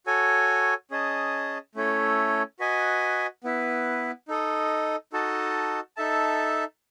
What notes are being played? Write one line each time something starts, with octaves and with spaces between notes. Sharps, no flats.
F#4 A4 C#5 G#5
C#4 G#4 D#5 A5
A3 C#4 E4 A4 C#5
F#4 B4 D#5 G#5
B3 E4 B4
D#4 A4 D#5
D#4 F#4 A4 D#5 A5
D#4 A4 E5 A5